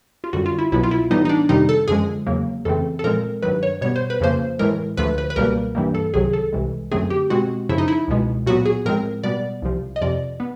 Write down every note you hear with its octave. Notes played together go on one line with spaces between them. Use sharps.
F4
F#2 D3 G3 F#4
F4
E4
C2 B2 F#3 B3 E4
F4
E4
A2 E3 G3 B3 D#4
D#4
D4
F2 C3 D#3 G3 D#4
A4
F#2 D3 F3 G#3 G#4
E2 C#3 F#3 A#3
F2 C#3 E3 A3 C4 A4
A4
A#2 F3 G#3 C4 A#4
G2 D#3 F#3 B4
C#5
B2 G3 B3 C#5
C5
B4
F2 C#3 F3 A#3 C5
A2 E3 G#3 A#4
D2 D3 F3 A3 B4
B4
B4
C#2 B2 G3 A#3 A#4
G2 E3 G3 A#3
A4
C2 C3 D#3 F#3 G#4
A4
C2 C3 E3 G#3
F#2 D3 F#3 A3 C4 G#4
G4
B2 G#3 C4 F#4
F#2 C#3 F3 E4
D#4
E4
C#2 B2 G#3
A#2 F#3 B3 F#4
G#4
A2 F3 G#3 C4 A#4
B2 G3 B3 D5
C2 C3 F3
D#5
F2 C3 F3 D5
B3